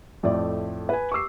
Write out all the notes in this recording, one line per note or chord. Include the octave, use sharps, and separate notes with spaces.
F2 A2 A3 D5
B4 G#5
C#6 D6 E6 C7